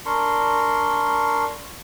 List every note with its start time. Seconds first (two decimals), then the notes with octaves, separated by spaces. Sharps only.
0.06 D4 A#4 C6 C#6